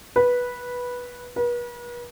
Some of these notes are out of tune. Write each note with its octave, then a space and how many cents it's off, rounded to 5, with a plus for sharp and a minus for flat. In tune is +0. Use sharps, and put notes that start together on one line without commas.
B4 -10
B4 -40